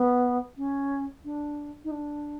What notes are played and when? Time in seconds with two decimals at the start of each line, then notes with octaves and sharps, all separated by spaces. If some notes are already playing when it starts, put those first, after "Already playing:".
Already playing: B3
0.57 C#4
1.25 D4
1.84 D#4
1.91 D4